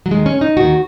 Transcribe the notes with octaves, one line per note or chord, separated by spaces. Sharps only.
F#3
D#2 D#3 G#3
C#4
D#4
D#2 D#3 F#4